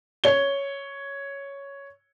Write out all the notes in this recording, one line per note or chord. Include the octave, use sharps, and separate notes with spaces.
C#5 G7